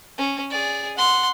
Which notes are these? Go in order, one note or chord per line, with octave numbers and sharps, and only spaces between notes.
C#4
G#4 D5
F#5 C6